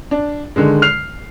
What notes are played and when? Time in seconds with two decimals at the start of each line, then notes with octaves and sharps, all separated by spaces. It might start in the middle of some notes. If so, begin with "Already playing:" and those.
0.11 D4
0.56 D3 D#3 G#3
0.82 F6 C7 F7